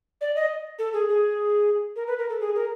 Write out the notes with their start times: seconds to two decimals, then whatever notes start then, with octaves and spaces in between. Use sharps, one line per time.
0.21 D5
0.35 D#5
0.79 A4
0.93 G#4
1.09 G#4
1.96 A#4
2.07 B4
2.18 A#4
2.29 A4
2.40 G#4
2.55 A#4